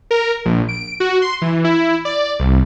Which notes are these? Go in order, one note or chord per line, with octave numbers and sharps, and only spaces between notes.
A#4
A#1
D7
F#4
C6
E3
E4
D5
C2